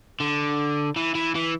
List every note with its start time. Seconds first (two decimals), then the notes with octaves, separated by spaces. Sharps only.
0.20 D3
0.96 E3
1.15 E3
1.35 E3